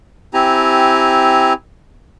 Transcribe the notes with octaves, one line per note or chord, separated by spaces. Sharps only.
C4 E4 G4 G#5 A#5